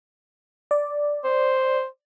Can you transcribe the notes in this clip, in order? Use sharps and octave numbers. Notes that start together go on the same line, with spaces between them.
D5
C5